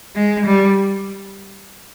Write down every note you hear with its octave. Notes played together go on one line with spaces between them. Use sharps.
G#3
G3